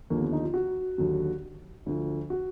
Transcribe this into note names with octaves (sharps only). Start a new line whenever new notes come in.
D#2 D3 F3 A#3
B3
D#4
F4
F#4
D#2 D3 F#3
D2 D3 F3
F#4